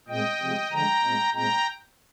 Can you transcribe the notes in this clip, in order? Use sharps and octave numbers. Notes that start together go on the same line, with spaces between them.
A#2 G#3 C4 D#5 G5
C3 F3 G#3 C4
D3 F3 G#3 G5 A#5
A#2 G#3 C4
A#2 G#3 C4 G5 A#5